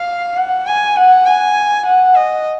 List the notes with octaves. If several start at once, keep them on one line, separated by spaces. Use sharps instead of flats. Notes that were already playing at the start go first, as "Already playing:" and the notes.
Already playing: F5
F#5
G#5
F#5
G#5
F#5
D#5